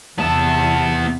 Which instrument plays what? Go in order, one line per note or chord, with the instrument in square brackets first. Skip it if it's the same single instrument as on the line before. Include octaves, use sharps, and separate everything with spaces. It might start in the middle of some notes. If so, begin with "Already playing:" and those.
[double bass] E2 C3 [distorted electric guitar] B3 E5 [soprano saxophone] A5